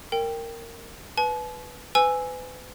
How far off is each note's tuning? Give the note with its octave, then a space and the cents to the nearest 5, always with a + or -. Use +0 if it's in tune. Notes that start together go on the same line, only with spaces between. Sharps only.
A#4 -15 G5 +10
B4 +0 A5 -45
B4 +35 G#5 +0 E6 +0